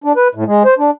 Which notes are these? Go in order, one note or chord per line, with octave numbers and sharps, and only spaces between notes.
D4
B4
A2
G#3
C5
D4